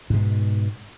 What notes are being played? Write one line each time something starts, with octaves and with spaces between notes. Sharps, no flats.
G#2 B2